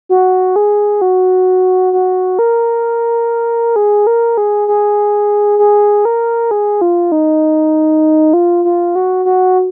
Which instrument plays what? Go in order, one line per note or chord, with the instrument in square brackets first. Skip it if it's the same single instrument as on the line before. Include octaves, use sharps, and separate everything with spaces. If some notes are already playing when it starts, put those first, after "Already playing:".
[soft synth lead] F#4
G#4
F#4
F#4
A#4
G#4
A#4
G#4
G#4
G#4
A#4
G#4
F4
D#4
F4
F4
F#4
F#4